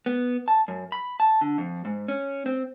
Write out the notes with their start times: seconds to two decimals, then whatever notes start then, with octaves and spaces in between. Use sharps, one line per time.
0.06 B3
0.48 A5
0.68 F#2
0.92 B5
1.20 A5
1.41 D3
1.58 F2
1.85 G#2
2.08 C#4
2.46 C4